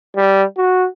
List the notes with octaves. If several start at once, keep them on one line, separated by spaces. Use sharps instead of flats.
G3
F#4